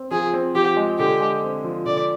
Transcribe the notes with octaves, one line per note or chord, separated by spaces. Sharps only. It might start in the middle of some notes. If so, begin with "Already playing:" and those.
Already playing: C4
F3 G#4
C4
F3 G4
G#3
D3 G4
G#3
C4
F3
D3 D5